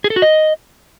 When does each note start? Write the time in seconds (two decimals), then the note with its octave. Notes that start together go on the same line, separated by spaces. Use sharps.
0.04 G#4
0.10 A4
0.16 F#4
0.22 D#5